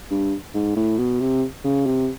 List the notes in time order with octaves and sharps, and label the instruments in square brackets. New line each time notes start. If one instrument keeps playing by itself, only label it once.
[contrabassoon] G2
G#2
A2
B2
C3
C#3
C3